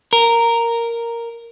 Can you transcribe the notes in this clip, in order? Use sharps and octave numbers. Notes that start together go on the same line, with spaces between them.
A#4